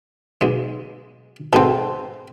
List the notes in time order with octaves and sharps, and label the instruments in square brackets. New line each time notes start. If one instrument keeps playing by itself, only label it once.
[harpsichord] B1 G#3
[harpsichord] G#2 B2 [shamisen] C4 A4